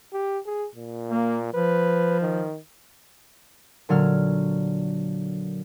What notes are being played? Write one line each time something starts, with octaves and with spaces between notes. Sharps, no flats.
G4
G#4
A#2
A#3
F3 B4
D#3
A#2 D3 F#3 F6